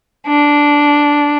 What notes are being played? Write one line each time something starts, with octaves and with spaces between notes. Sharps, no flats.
D4